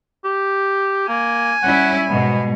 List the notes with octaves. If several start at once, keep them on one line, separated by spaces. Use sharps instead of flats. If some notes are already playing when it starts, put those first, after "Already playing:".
G4
A#3 G#5
G3 C#4 E4 F#5
G#2 B2 G3 B3